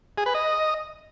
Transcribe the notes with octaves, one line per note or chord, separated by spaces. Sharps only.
G#4
B4
D#5